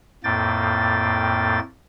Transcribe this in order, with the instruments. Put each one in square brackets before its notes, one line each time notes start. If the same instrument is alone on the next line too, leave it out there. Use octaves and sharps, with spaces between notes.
[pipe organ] F2 A2 A#3 G5 A6